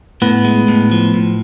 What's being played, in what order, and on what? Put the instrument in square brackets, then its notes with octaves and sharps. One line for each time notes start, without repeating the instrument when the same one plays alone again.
[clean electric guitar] A2 B3
G#3
A2
F3
A2